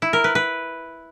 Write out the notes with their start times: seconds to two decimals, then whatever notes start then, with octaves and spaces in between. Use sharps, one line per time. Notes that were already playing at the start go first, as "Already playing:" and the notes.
0.02 E4
0.13 A#4
0.24 B4
0.35 B4